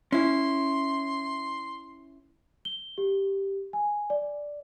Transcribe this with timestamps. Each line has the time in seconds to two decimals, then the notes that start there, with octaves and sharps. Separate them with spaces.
0.12 C#4 E4 C6
2.65 G7
2.98 G4
3.73 G#5
4.10 D5